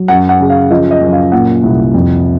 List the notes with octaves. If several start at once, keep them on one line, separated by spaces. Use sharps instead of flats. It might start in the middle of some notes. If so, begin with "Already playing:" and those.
Already playing: F#3
F#2 F#5
F#5
C#3
F5
F3 D#5
D#5
F#2
F5
A#2 F#5
C2
F2